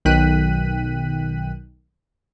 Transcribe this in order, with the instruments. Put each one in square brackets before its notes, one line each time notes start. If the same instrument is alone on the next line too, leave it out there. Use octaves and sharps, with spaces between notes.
[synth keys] B1 D#3 G5 F#6 B6 D#7